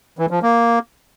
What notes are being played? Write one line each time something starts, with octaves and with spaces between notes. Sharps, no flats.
E3
F3
A#3